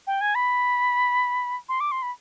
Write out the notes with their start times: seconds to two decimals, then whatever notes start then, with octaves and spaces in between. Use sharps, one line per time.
0.07 G5
0.21 G#5
0.35 B5
1.69 C6
1.80 D6
1.92 C6
2.02 B5